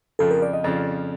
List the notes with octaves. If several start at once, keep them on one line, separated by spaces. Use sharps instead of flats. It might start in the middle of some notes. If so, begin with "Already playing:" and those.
F2 C#3 F3 A4
A#4
D5
D#5
F2 C#3 F3 D5